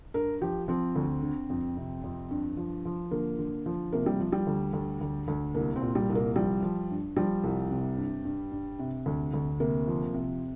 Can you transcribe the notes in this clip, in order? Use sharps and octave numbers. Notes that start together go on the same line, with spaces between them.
G2 A#4
F3 G4
F3 C4
D2
D3
F2
C3
F2
G2
F3
F3
D3 A#3
D3
F3
C3 A#3
G3
F3
G3
D2
D2
D2
D2
C2 A#3
C4
A#2
G3
C2
A#3
F3 G3
F3
G2
F3 G3
C2
C3
G2
G2
G2
C3
D2
D2
C3 A#3
F3
C3